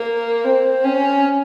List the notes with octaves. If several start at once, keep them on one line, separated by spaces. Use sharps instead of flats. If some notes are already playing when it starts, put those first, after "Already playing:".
Already playing: A#3
C4
C#4